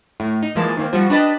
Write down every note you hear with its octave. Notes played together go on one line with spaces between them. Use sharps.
A2
D#4
E3 F3 G#3 A#3 A5
D#3 A#3 C4
F3 G3 F#4
D4 G4 B4 D#5 A5 B5